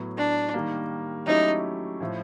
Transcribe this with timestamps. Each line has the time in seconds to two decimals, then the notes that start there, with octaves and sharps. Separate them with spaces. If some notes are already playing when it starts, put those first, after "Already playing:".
Already playing: A2 F#3 B3
0.17 D4
0.54 D#3 G3 A#3
1.27 F#3 A3 C#4 D#4 E4 G4
2.00 A2 F3 A3